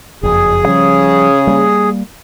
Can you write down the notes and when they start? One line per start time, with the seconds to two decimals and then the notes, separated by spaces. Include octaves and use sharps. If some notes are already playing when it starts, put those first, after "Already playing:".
0.23 F#1 F2 G#4
0.65 C#3 F3 G3
1.47 G3 A#3